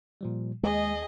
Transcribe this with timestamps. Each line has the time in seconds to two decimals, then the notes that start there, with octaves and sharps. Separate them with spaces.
0.21 A#2 F3 G3
0.63 D#2 G#3 G#4 D#5